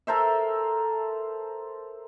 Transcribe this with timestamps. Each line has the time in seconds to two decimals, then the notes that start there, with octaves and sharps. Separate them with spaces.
0.07 A4 A#4 C5 E5